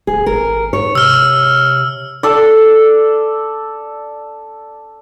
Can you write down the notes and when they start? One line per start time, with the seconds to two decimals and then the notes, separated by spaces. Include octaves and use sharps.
0.07 D1 G#4
0.26 G#1 A#4
0.73 G#2 C#5
0.95 C3 E6 F6
2.23 A4 D5